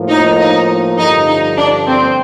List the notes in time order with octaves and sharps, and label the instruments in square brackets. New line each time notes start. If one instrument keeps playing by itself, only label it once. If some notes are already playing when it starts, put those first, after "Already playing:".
Already playing: [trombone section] A2 F3 A#3
[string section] D#4
D#4
[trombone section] G2 D3 F3 [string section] D#4
[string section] D#4
D4
C4